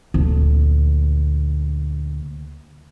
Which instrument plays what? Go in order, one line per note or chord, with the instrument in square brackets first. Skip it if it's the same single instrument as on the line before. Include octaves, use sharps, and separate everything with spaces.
[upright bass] D2 A#2